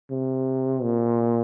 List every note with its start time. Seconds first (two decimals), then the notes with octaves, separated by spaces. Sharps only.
0.11 C3
0.83 A#2